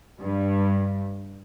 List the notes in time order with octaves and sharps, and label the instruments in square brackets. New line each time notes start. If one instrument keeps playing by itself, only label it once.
[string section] G2